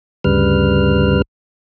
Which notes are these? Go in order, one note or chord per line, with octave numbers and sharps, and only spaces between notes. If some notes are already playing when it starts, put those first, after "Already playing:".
D2 G2 C#3 G3 B4 F6